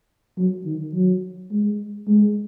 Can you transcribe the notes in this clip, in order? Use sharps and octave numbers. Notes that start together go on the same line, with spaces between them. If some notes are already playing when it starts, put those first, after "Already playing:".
F#3
D#3
F#3
G#3
G#3